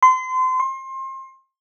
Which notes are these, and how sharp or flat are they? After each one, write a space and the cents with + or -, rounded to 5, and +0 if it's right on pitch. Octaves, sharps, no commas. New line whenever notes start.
C6 -30
C6 +30